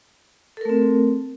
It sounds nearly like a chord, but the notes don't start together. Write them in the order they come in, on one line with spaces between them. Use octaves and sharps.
A4 A#4 A3 C4